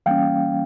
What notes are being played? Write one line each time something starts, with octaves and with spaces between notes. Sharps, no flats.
E3 G3 A#3 C#4 F5 G5